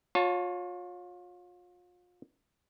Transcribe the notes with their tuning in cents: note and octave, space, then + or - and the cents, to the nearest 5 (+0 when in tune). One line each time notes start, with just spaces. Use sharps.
F4 +35 C#5 +0 A5 +0